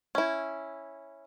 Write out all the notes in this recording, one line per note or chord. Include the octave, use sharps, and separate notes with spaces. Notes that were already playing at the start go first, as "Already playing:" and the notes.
C#4 E4